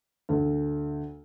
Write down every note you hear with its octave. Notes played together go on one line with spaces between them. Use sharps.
D2